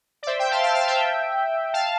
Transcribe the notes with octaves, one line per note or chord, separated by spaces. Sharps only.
D5
C5 E5
E5 G5
F5 A5
F5 A5
F5 A5
E5 G5
F5 A5